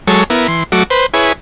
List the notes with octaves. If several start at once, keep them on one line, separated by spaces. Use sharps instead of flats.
F#3 G#3 A4 C#5
B3 E4 A#4
E3 C6
F#3 A3 F#4 D6
B4 C5
E4 G#4 B4 C#5